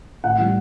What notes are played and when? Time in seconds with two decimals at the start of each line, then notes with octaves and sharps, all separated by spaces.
0.24 A2 F#5
0.38 E3 G3